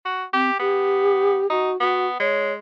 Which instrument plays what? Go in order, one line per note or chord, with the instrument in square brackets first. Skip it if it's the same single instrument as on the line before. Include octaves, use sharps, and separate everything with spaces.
[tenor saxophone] F#4
[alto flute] C4 [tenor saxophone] G4
[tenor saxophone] B3 [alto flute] G4
[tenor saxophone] D#4 [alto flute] F#4
[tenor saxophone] B3 [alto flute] F#4
[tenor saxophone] G#3 [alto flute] C#5